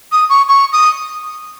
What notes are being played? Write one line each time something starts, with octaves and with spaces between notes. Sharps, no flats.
D#6
C#6
C#6
D#6